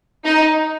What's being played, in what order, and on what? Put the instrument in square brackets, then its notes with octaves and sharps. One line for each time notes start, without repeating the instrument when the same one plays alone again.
[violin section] D#4